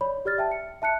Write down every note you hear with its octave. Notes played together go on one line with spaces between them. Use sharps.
C#5 D5 B5
G4 D5 F6 A6
E5 G5 A5
C#7
E5 A5 F#6 C#7